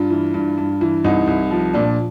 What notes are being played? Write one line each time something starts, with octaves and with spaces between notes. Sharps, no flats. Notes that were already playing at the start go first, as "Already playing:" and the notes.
Already playing: G2 F4
E3
G2
G2
E3
C2 D#4
C2
F3
A#2 D4